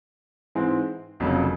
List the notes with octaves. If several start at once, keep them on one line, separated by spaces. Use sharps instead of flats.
G#2 E3 G#3 C4
F1 F2 C#3 F#3 A#3